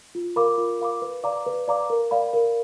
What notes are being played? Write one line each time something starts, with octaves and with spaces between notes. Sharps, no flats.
F4
A#4 F5 B5 D6
F4
A#4 F5 B5 D6
B4
D5 F5 A#5 D6
B4
D5 F5 A#5 D6
A#4
D5 F5 B5
A#4